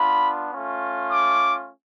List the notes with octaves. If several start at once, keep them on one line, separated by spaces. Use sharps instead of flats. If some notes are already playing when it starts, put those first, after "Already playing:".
Already playing: B3 D4 F4 B5
A3 C#4 F4
D6